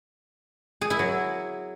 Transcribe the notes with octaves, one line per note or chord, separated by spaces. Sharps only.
G#4
E4
F#3